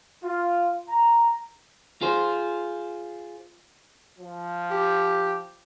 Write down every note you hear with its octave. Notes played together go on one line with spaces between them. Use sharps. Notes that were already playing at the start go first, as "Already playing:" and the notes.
F4
A#5
F4 G#4 C5
F3
G4